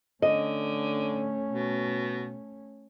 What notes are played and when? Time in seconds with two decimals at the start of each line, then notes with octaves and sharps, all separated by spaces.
0.22 D3 A3 C#4 D#5
1.50 B2